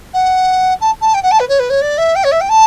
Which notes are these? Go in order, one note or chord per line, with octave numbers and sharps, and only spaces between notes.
F#5
A5
A5
G5
F#5
A5
B4
C#5
B4
C#5
D5
E5
G5
C#5
E5
G5
A5